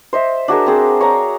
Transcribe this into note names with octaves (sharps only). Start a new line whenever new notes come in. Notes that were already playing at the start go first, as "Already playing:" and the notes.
C5 D#5 E5
D4 F#4 G#4 A#4
C4 G#4 C5
C#5 F#5 A#5